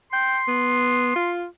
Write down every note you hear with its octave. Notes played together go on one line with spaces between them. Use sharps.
G5 C6
B3
F4